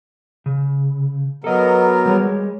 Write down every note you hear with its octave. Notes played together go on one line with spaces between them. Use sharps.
C#3
F#3 B3 A4 A#4 D#5
G3 G#3 C#5